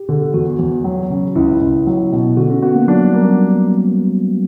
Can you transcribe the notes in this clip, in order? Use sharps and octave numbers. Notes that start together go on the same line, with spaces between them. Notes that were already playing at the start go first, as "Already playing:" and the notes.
Already playing: G4
D3
E2 F#4
E2
F#3
C#3
C#2 E4
C#2
F#3
B2
D3 F#4
C#4
B3 F#4
A#3
F#3 D4
G3
A#3
G3